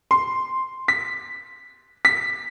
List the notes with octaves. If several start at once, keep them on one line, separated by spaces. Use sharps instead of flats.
C6
B6
B6